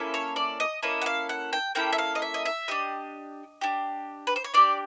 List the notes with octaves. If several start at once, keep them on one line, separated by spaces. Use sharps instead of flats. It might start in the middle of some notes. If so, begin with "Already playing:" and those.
Already playing: A#3 C#4 E4 A4
C#5
D5
D#5
A#3 C#4 E4 A4 D#5
F#5
F5
F#5
G5
A#3 C#4 E4 A4 G5
E5
F5
D#5
E5
D#5
E5
D4 G4 D#5
D4 G4
B4
C5
C#5
D4 G4 D5